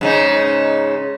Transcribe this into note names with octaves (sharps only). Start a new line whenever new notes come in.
G#2 C#3 D#4